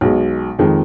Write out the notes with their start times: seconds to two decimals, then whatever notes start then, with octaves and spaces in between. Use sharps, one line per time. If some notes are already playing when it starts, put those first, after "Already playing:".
0.01 B1 B2 G#3
0.59 F2 D#3 G#3